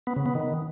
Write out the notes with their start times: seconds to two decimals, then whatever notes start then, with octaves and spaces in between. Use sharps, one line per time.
0.07 B3
0.16 C#3
0.26 B3
0.35 D#3